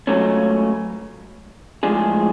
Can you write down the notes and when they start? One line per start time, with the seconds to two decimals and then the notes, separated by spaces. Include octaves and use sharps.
0.07 C#2 C#3 F#3 A3 C#4
1.83 A2 F3 G#3 D4 G#4